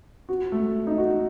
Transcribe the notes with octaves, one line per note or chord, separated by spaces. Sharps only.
F#4
A3
D#4
F#4